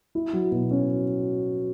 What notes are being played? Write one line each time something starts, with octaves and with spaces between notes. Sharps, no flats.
E4
F#3
B2
C#4